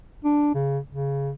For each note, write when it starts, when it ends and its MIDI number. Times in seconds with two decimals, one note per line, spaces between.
0.24 0.53 62
0.54 0.79 49
0.89 1.32 49